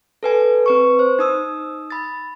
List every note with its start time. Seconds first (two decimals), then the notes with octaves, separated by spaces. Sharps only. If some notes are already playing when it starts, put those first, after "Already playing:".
0.23 A4 B4 G#5
0.66 C4 B4 C#6
0.99 C5
1.19 D#4 D#6 E6
1.90 B5 A6